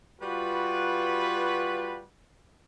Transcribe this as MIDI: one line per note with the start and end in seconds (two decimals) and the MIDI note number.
0.21 2.02 55
0.21 2.02 65
0.21 2.02 66
0.21 2.02 71